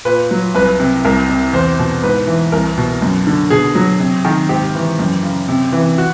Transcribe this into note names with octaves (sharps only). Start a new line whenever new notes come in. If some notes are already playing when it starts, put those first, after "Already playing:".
A#2 B4
F#3
C2 B4
C3
C2 A#4
C3
E2 C5
B2
G#2 B4
E3
C2 A#4
B2
F#2
D3
B2 G#4
F#3
C3
D#3
G#2 G4
E3
F#2
C#3
C3
E3
F#4